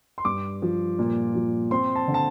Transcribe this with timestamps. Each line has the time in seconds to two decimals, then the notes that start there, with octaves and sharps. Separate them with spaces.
0.18 C6
0.25 G2 D6
0.62 F3
0.99 A#2
1.35 F3
1.71 C4 C6
1.96 A5
2.08 D3
2.14 A5